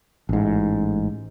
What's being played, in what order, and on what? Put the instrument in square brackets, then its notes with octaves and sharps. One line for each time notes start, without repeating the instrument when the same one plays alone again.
[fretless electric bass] A1 G#2